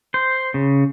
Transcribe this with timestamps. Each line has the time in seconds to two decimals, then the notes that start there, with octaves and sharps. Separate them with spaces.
0.14 C5
0.54 C#3